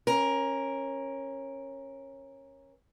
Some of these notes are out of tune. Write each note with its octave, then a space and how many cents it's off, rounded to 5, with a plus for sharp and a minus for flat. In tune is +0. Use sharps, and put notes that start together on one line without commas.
C#4 -20 A#4 +5